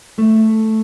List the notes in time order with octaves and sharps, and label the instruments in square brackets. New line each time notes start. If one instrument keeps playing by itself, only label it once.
[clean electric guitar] A3